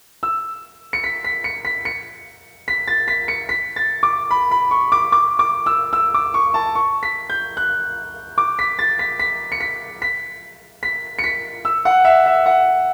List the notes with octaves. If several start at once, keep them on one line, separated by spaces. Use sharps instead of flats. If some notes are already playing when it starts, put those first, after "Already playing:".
E6
C#7
B6
B6
C#7
B6
C#7
B6
A6
B6
C#7
B6
A6
D6
B5
B5
C#6
D6
D6
D6
E6
E6
D6
C#6
A5
C#6
B6
G6
F#6
D6
B6
A6
B6
B6
C#7
B6
B6
B6
C#7
B6
E6
F#5
E5
E5
F#5